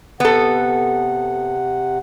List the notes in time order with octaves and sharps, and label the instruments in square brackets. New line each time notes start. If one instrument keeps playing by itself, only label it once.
[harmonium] C3 F#5 [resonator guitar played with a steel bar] B3 A4